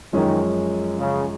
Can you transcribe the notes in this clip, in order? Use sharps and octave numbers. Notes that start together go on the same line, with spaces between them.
F#2 D#3 F3 G#3 C#4
C#3